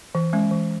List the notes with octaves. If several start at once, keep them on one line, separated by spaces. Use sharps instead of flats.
E3
G#3 C#4
E3